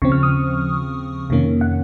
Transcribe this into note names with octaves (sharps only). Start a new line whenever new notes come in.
D#2 C#3 F3 C4 C#6
F6
D#6
F2 C3 D#3 A#3 C#4
F#5